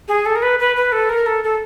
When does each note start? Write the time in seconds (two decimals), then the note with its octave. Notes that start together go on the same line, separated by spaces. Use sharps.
0.08 G#4
0.26 A4
0.36 A#4
0.42 B4
0.59 B4
0.76 B4
0.92 A4
1.09 A#4
1.26 A4
1.44 A4